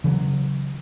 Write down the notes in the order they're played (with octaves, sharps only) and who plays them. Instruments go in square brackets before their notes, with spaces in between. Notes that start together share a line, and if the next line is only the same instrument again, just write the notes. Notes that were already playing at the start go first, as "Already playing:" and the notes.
[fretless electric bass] C#3 E3 F#3